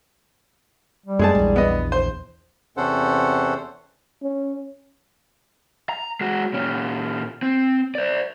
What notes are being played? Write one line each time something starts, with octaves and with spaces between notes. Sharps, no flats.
G3
F#2 G#3 A3 G#4 A5
A#1 E2
B3 D#5
C5
E2 C3 C#4 A4 C5 F#5
C#4
A#5
G#3 F#4
A#2 C#4
C4
C5 D5